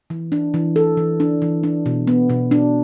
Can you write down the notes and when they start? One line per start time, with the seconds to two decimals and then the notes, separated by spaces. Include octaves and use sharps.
0.10 E3
0.32 D4
0.54 E3
0.76 A4
0.97 E3
1.20 D4
1.42 E3
1.63 D4
1.86 B2
2.07 B3
2.30 B2
2.51 D4